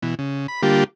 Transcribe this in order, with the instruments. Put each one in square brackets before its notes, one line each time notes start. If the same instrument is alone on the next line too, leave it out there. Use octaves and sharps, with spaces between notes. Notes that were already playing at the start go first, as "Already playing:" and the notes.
[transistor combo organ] B2 E3
C#3
B5
D3 G3 A#3 F4 G4